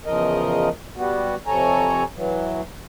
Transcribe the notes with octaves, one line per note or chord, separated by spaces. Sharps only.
E2 C#3 F3 A#4 D#5
G3 B3 F#4
F2 C3 A4 C#5 G#5 A#5
E3 F#3